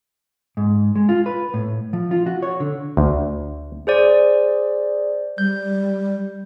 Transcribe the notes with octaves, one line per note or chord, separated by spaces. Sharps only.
G#2
G#3
F4
B4
A2
F3
F4
F#4
C#5
D3
D2
G#4 C5 D5
G3 G6